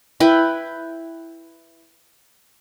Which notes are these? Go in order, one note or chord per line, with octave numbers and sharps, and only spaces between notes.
E4 B4 G5